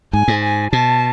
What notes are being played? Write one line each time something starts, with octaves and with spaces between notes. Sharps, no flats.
G#2 G#5
G#2
G#5
B2 A5